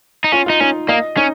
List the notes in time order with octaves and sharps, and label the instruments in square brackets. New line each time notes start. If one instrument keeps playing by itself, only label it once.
[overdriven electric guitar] D#4
[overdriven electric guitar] C#4 [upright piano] F4
[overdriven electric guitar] D#4 [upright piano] F4
[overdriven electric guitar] C#4 [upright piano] D#4
[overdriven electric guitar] A#3 [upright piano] D#5
[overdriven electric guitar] C#4 [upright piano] D#4